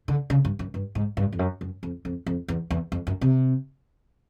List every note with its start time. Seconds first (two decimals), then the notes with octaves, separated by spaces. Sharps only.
0.08 D3
0.30 C#3
0.45 G2
0.59 F#2
0.74 G2
0.95 G#2
1.17 G2
1.32 F2
1.39 F#2
1.61 F#2
1.83 F2
2.05 F2
2.26 F2
2.48 E2
2.70 E2
2.92 F2
3.07 F#2
3.21 C3